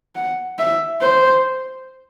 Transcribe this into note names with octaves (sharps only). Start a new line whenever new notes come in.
F#5
E5
C5